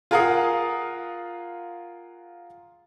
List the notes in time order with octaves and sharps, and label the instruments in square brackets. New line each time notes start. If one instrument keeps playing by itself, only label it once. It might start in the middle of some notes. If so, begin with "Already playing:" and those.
[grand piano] F4 G#4 A#4 F5 F#5 D#6